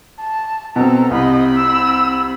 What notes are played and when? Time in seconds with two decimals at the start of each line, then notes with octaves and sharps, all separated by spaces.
0.20 A5
0.76 B2 C4 A4 A#5
1.11 C2 C4 D#5 B5
1.55 E6